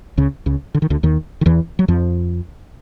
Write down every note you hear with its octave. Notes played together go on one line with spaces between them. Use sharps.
C#2 C#3
C#2 C#3
D3
D#3
D2 D3
D#2 D#3
D#3
E2 E3
F#3
F2 F3